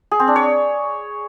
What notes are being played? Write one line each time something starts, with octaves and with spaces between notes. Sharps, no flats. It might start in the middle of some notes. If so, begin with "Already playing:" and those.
G#4
C4
D4
C#5